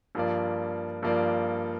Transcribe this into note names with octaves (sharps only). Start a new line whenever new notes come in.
G2 F3 A#3 F4 D5
G2 F3 A#3 F4 D5